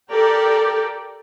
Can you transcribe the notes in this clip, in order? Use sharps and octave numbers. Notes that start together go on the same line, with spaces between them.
G4 A4 A#4 D5 G5